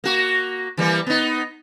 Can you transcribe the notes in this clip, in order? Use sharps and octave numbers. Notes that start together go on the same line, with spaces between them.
A#3 F#4
E3 G3 A#3
B3 D#4